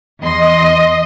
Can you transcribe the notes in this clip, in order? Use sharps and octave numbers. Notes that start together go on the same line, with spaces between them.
E2 D#5 C6